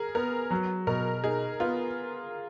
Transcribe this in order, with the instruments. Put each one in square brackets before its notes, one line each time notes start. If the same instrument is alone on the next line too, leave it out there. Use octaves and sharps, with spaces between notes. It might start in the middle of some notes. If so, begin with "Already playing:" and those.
Already playing: [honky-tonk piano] G#4 A#4
[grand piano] B3 [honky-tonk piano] A#4
[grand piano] F#3
[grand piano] B2 [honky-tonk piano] A#4
[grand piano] D#4 [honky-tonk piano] G#4
[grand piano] B3 [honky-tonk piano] F4